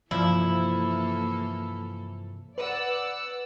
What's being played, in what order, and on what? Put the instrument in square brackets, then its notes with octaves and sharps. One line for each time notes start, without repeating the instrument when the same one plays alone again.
[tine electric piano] G2 C3 [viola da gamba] E3 A#3 A4 [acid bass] F3 [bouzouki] E4
[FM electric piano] B4 [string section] D5 F#5 E6